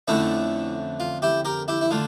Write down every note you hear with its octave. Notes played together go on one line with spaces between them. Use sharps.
F2 D3 A3 C#4 E4
F4
E4 G4
G4 A#4
E4 G4
E4
D3 A3 F4